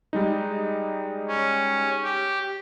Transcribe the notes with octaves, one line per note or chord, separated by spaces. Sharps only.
G3 G#3 D#4
C#4
G4